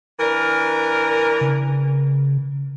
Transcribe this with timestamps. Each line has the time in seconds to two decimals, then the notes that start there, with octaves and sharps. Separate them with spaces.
0.19 E3 D4 A#4
1.41 C#3